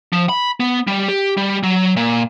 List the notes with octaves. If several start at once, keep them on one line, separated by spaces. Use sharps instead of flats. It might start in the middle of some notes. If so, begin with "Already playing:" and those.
F3
B5
B3
G3
G4
G3
F#3
A#2